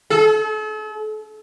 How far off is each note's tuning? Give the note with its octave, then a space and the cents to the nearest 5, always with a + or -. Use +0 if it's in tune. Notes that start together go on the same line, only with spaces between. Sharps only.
A4 -40